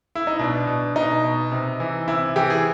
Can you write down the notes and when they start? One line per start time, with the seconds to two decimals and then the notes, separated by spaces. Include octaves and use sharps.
0.15 E4
0.27 D#4
0.39 B2 D4
0.67 B2
0.95 B2 D#4
1.24 B2
1.52 C3
1.80 E3
2.08 C3 E4
2.36 E3 G4
2.50 G#4